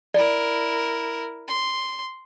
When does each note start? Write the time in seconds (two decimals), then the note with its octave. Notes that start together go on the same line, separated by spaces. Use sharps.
0.14 E4 A#4 D5
1.48 C6